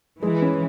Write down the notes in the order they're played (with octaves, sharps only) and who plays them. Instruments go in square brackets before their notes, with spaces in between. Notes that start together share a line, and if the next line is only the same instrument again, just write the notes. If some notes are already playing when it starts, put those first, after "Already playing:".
[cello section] E3 [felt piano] G#3
[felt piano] C#4